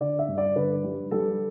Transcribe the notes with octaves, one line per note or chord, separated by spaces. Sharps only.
D3 D5
E5
G2
D5
D3 B4
G3
G3 A4